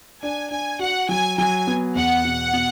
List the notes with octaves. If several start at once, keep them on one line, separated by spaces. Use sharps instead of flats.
D4 G#5
D4 G#5
F#4 F#5
F#3 G#5
F#3 G#5
B3
E2 F#5
B2
B2